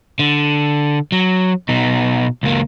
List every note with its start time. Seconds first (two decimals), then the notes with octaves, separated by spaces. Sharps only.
0.19 D3
1.12 F#3
1.69 B2 D#4
2.43 C#2 A#3